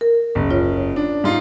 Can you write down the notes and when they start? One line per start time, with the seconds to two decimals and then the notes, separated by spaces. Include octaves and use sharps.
0.01 A#4
0.35 F#1
0.51 F4 C#5
0.96 D4
1.24 G#2 F4